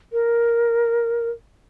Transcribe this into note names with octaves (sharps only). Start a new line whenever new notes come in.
A#4